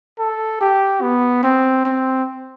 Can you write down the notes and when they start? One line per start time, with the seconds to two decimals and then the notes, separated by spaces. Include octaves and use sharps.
0.19 A4
0.61 G4
1.01 B3
1.43 C4
1.85 C4